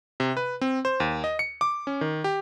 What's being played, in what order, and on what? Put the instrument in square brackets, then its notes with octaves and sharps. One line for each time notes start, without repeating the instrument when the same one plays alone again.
[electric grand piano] C3
B4
C4
C5
D#2
D#5
C#7
D6
C#4
D#3
G4